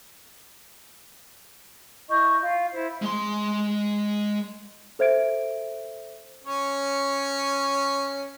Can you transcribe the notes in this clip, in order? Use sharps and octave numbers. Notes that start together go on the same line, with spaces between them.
E4 D#5 C#6 G6
F4
E4 C5
G#3 C6
A4 C5 E5 G#6 D7
C#4 C#5